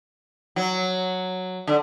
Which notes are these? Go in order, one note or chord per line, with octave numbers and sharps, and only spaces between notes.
F#3
D3